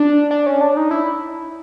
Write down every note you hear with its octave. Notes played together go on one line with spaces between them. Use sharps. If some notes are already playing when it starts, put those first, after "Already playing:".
Already playing: D4
D4
C#4
D4
D#4
E4